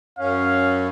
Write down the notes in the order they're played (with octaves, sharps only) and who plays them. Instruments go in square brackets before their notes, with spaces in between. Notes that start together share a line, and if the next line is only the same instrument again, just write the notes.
[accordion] F#2 C#4 [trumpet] F5